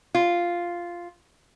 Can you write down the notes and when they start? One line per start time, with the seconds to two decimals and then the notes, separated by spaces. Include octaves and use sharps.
0.15 F4